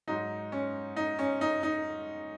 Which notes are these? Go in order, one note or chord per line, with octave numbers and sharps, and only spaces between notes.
G#2 F#3 D#4
C#4
D#4
C#4
D#4
D#4